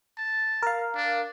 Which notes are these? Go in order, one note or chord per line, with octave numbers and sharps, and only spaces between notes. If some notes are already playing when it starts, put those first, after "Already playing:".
A5
A#4 F5
D4